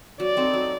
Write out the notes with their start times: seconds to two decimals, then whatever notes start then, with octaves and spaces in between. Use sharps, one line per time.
0.20 F#3 D5
0.37 C4 D#4 A4
0.54 F#3